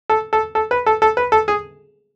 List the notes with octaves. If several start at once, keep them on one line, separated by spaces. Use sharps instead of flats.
A4
A4
A4
B4
A4
A4
B4
A4
G#4